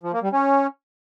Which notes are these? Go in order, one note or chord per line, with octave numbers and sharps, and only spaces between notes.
F3
A#3
G3
C#4